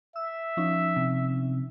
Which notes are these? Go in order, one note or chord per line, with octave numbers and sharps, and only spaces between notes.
E5 E6
F3 C#4 D#4
C3